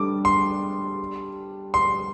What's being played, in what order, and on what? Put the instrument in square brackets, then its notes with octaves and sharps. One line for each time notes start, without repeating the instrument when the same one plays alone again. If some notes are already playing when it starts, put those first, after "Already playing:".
Already playing: [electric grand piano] G3 D4 A4 [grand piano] D6
[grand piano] C6
C6